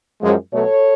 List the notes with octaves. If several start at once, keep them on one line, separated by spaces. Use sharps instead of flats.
F#2 F3 G#3
B2 F#3 A3 A4 C#5